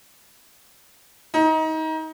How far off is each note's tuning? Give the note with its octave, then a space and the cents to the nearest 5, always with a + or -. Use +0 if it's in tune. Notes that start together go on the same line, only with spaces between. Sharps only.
D#4 +25